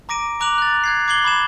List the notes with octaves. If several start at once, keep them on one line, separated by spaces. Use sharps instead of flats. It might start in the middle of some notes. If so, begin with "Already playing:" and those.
A#5 D6 A#6 D7 D#7
A#5 D6 F#6 F7 F#7
F#6 A6
F#6 G#6 C7
D6 G#6 C7 F#7 G7
B5 D6 G#6 E7